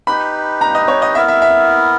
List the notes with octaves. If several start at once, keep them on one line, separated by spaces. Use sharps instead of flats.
D#4 G4 B4 B5
A#5
D#5
C#5
D#5
B3 E4 A#4 E5
E5
E5